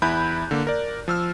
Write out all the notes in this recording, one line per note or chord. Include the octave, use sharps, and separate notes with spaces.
E2 E4 B5 F#6 G6
D3 A#3
A#4 D5
F3 E6 F6